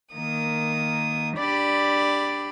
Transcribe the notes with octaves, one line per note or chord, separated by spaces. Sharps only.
D#3 A#3 D#6
D4 G4 D5 B5 D6